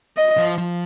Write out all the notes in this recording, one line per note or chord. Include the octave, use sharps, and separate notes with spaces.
D#5
F3
F3